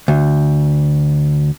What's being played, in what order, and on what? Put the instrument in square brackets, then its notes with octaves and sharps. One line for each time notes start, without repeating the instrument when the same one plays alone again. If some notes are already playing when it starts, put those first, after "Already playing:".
[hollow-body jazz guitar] D2